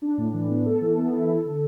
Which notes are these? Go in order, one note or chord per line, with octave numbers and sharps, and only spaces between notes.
D4
A2
E3
B3
A4
E3
B3
E4
A4
D3